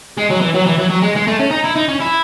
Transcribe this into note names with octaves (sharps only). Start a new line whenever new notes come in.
G#3
F#3
E3
F#3
E3
F#3
F#3
G#3
G#3
A3
C#4
D#4
E4
D#4
C#4
E4